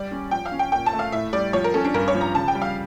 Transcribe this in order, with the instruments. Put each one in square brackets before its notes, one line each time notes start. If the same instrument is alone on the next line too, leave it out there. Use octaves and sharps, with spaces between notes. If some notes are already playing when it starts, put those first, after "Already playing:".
Already playing: [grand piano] G3 [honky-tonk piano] D5
[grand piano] C#4
[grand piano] F3 [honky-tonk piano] G5
[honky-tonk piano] F5
[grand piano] C#4
[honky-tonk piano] G5
[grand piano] A#2 [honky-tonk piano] G5
[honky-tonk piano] A5
[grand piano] A3
[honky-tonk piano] F5
[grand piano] A2 [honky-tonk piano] E5
[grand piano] G3 [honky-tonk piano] D5
[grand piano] F3 [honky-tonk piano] C#5
[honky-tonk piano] A#4
[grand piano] C#4 [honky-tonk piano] A4
[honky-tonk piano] D4
[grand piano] G2 [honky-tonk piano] A#4
[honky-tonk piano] C#5
[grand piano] F3
[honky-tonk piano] A#5
[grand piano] C#3 [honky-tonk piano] A5
[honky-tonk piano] G5
[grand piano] G3
[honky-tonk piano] F5